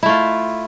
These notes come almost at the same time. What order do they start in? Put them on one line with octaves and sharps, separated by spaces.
E4 A3 F4